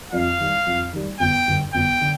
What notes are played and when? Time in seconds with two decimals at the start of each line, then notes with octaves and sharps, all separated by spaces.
0.12 F2 F5
0.39 D#3 G3
0.66 F2
0.93 D#3 G3
1.20 G1 G5
1.47 G2 D3
1.74 G1 G5
2.01 D3